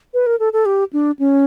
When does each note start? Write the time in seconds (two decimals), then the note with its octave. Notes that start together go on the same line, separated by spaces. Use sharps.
0.14 B4
0.26 A#4
0.40 A4
0.53 A4
0.66 G4
0.93 D4
1.19 C#4